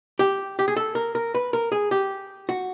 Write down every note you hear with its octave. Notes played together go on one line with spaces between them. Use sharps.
G4
G4
G#4
A4
A#4
A#4
B4
A#4
G#4
G4
F#4